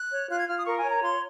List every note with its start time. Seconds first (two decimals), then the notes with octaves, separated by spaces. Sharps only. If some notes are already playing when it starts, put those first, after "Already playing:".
Already playing: F#6
0.11 C#5
0.30 F4 F#6
0.39 G#6
0.48 F4 F6
0.57 D#6
0.66 A#4 C#6
0.77 G#5
0.84 C#5
0.91 A#5
1.02 F4 C6